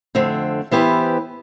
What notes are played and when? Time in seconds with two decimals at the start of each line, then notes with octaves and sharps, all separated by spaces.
0.15 F2 D3 A3 C4
0.71 E3 B3 E4 G4 C5